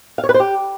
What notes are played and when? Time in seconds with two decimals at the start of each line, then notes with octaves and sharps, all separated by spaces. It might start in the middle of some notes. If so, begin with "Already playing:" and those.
0.18 F5
0.24 C#5
0.29 B4
0.34 C5
0.40 G4